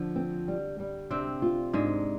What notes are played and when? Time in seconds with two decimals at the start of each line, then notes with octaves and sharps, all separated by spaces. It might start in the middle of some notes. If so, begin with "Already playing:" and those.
Already playing: D3 F3
0.16 C4
0.48 G3
0.80 G3
1.11 C3 C4 D4
1.42 F4
1.73 G#2 G#3 D4